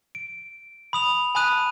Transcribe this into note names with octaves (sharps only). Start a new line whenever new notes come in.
D7
B5 D#6 F7
G#5 A5 B5 D#6 F#6 D#7